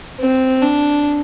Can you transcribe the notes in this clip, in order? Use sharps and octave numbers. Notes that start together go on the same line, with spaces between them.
C4
D4